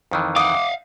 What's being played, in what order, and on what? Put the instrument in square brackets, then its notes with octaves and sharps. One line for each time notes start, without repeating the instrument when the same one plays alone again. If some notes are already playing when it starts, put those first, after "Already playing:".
[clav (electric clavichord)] F2 D#3 E3
[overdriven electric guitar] F5 F#5 [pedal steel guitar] D6 [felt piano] D#6